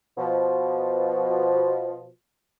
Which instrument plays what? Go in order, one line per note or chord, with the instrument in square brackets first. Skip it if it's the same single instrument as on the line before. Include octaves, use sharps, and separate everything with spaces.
[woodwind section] B2 F3